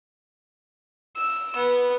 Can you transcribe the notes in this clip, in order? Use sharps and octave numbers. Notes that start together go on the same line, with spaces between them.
E6
B3